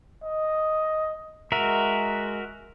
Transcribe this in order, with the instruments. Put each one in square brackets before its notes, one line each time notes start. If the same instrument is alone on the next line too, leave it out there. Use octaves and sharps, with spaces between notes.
[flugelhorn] D#5
[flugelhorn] G#3 [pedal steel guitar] F#4 A#4 E5